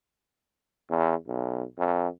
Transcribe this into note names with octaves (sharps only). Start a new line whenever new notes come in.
E2
B1
F2